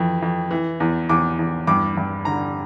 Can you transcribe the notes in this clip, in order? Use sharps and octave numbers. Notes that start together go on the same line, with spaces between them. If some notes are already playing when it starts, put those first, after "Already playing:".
Already playing: F2 E3
F2
E3
E2
E2 D6
E2
G2 D6
G2
D3 A#5